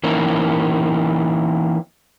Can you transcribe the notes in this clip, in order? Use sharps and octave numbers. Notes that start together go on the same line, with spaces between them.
E3 A#3 C#4 D#4